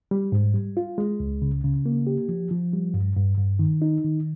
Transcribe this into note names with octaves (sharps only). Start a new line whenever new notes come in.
G3
G#2
G3
F4
G#3
C#2
C#3
C#3
A#3
G4
F3
F3
G3
G2
G2
G2
D#3
D#4
D#3